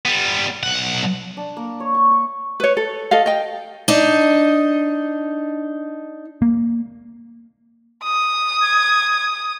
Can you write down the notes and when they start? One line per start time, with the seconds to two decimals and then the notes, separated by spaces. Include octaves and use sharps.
0.06 G3 B3
0.63 B1 F#5
1.37 D4
1.57 A#3
1.80 C#5
1.95 C#6
2.11 C#6
2.60 B4 C#5
2.77 A4
3.11 A4 D#5 F5
3.26 D#5 G5
3.88 D4 D#4
6.42 A#3
8.04 D#6
8.61 G#6